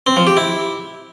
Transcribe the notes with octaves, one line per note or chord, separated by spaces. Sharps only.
C4
F3
G4
E4